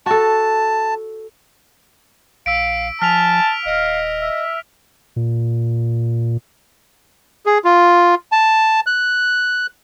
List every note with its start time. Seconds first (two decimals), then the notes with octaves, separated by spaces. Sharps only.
0.06 F#4 A4 A5
2.46 A#1 F5 E6 B6 D7
3.02 F3 G#5 A5 F6 B6 F7
3.66 D#1 D#5 F5
4.20 E5
5.16 A#2
7.46 G#4
7.65 F4
8.32 A5
8.87 F#6